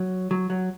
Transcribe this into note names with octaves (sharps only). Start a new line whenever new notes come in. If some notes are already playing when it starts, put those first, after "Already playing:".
Already playing: F#3
F#3
F#3